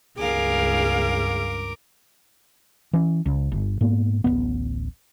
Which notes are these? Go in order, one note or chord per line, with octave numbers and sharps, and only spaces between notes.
C#2 G2 G#4 A#4 F5 D6
E3 C#4
C#2
G1
G#2 A#3 B3
D1 A1 G#2 B3